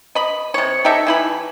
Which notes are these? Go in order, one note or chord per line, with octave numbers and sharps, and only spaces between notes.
D#5 B5
C3 C#5
D#4 G4 A4 E5
E3 E4 B5